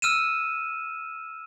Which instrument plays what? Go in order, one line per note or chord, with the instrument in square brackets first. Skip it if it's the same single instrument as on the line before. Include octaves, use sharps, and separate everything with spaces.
[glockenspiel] E6 F6 D#7 E7